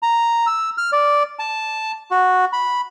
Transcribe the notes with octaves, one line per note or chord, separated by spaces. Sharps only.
A#5
E6
F6
D5
A5
F#4
B5